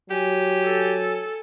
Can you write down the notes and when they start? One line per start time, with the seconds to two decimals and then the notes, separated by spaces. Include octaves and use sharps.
0.10 F#3 G4 G#5
0.65 A4